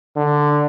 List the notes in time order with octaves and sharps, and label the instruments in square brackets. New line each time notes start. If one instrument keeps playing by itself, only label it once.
[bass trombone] D3